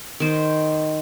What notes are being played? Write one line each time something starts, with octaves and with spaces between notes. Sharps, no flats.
D#3 C5